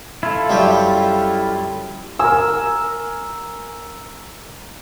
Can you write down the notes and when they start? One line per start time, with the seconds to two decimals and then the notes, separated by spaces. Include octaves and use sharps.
0.23 E4 F4 A4
0.49 F#2 G3 G4
2.19 A#4 G#5 E6